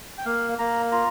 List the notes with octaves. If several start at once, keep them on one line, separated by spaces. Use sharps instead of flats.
G5
A#3 F5
A#3 A#5
F4 A#5